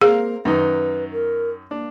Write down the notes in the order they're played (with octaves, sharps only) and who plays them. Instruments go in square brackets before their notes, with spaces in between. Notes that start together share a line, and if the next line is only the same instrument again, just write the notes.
[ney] A#3 [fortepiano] C4 A#4 F5 [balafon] G#4
[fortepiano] F#2 D#3 D#4 [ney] B4
[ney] A#4
[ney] A#3 [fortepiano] D4